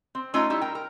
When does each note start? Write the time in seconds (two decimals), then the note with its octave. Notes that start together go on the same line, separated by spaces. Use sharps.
0.15 C4
0.34 A3 C#4 D#4 F4
0.50 G3 D#4 E4
0.61 A#4 G5
0.75 A#4